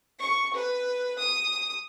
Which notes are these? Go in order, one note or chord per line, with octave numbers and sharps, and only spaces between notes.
C#6
B4
D#6